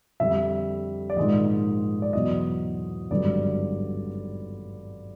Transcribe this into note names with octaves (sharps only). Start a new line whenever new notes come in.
F2 D3 G3 E5
D5
A#1 G#2 D#3 G#3 D#5
D5
E2 B2 F#3 D#5
G#1 G2 D3 F#3 D5